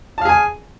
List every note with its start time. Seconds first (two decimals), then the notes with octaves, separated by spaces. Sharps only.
0.18 A5
0.22 F5
0.25 G#4
0.29 G#5